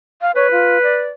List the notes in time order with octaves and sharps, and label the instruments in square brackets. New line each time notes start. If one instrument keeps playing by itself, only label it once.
[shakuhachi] F5
[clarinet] B4 [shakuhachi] C#5
[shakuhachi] F4
D5